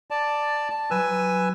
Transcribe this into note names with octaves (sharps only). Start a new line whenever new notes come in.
D5 A5
A5
F#3 G3 B4 G#5 E6